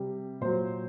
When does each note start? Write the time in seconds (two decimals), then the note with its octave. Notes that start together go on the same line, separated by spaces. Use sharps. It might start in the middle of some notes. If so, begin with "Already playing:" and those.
Already playing: C3 G3
0.41 A#2 F#3 C5